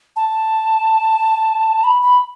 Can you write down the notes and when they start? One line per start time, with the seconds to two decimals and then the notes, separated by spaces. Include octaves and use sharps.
0.16 A5
1.84 B5
2.02 B5